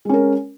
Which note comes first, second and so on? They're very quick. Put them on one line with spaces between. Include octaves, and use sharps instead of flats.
G#3 C#4 A#4